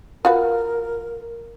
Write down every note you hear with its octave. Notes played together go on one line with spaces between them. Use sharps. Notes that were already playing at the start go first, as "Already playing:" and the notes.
F4 F#4 A#4 B4